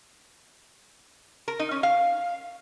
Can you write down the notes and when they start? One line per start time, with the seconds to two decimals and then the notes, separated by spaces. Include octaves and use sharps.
1.48 A#4
1.60 D#4
1.71 C#4
1.83 F5